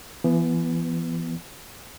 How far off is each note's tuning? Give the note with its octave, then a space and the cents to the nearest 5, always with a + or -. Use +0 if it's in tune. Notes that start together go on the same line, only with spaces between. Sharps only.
E3 +35 B3 +0